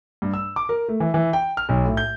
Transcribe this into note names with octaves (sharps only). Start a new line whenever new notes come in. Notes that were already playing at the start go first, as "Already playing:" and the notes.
G2
E6
D6
A#4
A3
E3
E3
G5
F6
B1
A2
G6